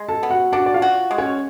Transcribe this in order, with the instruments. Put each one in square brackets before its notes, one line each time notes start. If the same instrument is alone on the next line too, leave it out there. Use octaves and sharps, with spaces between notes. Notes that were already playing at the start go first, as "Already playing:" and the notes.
Already playing: [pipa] G#3
[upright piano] A4 A5
[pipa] B3
[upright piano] F#4 F#5
[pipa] D4 [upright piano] F#4 F#5
[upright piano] D5
F4 F5
[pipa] F#4
G#3
[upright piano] C#4 C#5